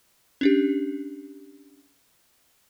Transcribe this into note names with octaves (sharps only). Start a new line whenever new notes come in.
C#4 D4 G4